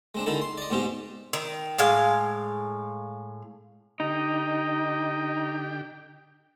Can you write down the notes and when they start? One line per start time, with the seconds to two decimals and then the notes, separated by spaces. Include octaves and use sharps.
0.15 G#3 C4 D4
0.26 D3 D#3 G#3 E4 A4
0.42 C6
0.58 D5 D#5
0.70 G#2 B2 G#3 C4 G4
1.33 D#3
1.78 A2 G#3 F5
4.00 D3 D#4 G4 D#5 G5